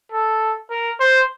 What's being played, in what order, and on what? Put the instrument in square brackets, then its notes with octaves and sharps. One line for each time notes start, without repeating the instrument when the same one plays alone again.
[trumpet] A4
A#4
C5